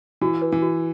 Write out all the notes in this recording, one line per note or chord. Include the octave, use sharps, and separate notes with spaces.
E3 F#4
B4
E3
F#4